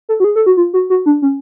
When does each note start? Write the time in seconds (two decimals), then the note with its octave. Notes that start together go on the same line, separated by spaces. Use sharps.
0.09 A4
0.20 F#4
0.24 G#4
0.36 A4
0.46 F#4
0.57 F4
0.74 F#4
0.90 F#4
1.06 D4
1.22 C#4